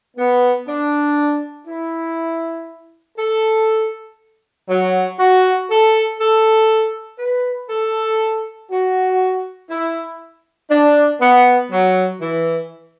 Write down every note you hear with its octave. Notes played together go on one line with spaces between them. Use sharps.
B3
D4
E4
A4
F#3
F#4
A4
A4
B4
A4
F#4
E4
D4
B3
F#3
E3